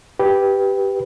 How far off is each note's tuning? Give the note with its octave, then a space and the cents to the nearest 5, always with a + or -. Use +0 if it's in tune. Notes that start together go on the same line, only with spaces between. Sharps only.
G4 +0 B4 +0